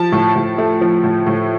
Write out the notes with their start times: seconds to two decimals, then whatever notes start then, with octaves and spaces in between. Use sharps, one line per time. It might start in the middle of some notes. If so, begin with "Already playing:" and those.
Already playing: F3 A5
0.12 A2
0.36 A2
0.58 A3
0.81 F3
1.04 A2
1.26 A2